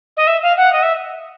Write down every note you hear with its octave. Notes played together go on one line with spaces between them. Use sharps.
D#5
E5
F5
F#5
D#5
E5